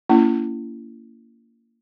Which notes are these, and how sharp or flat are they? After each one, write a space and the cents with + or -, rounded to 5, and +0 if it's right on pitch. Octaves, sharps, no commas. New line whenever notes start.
A#3 -15 C#4 +35 E4 +30